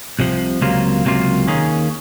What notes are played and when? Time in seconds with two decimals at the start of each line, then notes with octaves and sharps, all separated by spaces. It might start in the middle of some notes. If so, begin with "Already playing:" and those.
0.19 C2 C3 F3
0.61 C#2 C3 F#3 A#3 F4
1.05 C#2 C3 F#3 A#3 F4
1.47 D#2 D#3 A#3 C#4 G#4